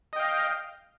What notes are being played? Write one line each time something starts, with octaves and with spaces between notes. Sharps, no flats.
D#5 F5 G5